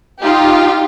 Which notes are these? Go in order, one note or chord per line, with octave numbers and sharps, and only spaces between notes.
D#4 F4 G4